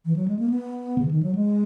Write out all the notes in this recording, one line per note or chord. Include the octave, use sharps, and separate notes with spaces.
E3
F#3
G#3
A#3
B3
C#3
E3
D#3
F#3
G#3